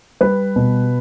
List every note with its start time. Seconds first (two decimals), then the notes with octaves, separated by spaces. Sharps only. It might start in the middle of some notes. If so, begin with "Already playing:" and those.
0.21 G3 B4
0.56 B2